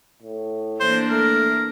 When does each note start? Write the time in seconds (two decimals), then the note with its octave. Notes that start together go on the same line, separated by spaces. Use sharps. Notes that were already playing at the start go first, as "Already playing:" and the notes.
0.22 A2
0.80 E3 A#3 D4 C5
1.10 A3 A#4